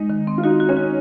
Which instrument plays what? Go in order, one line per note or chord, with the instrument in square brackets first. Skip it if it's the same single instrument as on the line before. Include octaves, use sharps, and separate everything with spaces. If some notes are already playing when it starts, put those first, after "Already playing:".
Already playing: [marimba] G#3 [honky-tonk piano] D#4
[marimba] D#3
C4
[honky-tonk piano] F4
[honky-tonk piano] D#4 [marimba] F#4
[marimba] F#4
[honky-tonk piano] C#4
[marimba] F#4